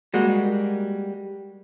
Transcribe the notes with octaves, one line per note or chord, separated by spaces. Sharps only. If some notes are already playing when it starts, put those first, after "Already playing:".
G3 G#3 A#3 F#4